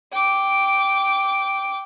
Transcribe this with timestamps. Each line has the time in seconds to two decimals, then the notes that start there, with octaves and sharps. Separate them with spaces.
0.12 G5 D6